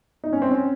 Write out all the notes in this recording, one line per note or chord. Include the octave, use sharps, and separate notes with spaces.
D#4
C#4
C4
C#4